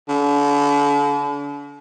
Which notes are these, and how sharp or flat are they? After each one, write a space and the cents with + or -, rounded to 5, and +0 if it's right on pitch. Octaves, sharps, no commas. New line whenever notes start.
D3 -40